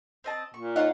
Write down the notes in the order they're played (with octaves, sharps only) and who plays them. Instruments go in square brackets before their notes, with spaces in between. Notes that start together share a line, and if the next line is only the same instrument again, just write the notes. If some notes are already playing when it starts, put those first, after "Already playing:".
[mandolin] C4 D#5 A5
[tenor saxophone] A#2 [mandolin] C#6
[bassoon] D#4 [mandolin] F4 C#5 F#5